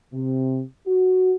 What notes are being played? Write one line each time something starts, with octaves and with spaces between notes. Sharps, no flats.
C3
F#4